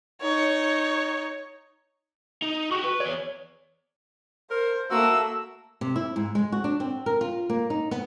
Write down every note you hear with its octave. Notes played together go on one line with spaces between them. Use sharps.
D#4 C#5
D#4
F#4 G4 C#6
B4
E2 C#5 D5
A#4 C5
A3 A#3 F#4 E6
C3
E4
G#2
G#3
F#4
D4
C4
A#4
F4
A#3
D#4
B3